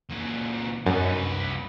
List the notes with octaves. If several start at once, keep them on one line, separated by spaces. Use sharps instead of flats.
A#2 E3
F#2 C#4 D#4
C2 B4